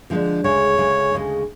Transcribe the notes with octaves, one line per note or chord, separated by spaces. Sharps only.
D3 F3 G#3 B3 D4
D2 C#3 G#3 C#5
D2 C#3 G#3
D2 C#3 G#3